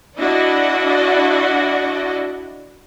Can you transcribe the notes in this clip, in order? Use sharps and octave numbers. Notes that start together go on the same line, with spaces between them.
D4 E4 F#4 D5 D#5